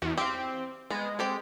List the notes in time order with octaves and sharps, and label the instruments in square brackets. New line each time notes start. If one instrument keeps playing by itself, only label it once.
[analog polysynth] E2 [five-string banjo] F#4
[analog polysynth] C4 [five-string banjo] G4 F5
[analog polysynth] G#3 [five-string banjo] B3
[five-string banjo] C4 G4 A4